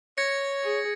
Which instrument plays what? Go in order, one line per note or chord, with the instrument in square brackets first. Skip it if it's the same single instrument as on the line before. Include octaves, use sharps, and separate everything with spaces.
[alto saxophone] C#5 [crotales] G#6 A#6 C#7
[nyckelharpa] G#4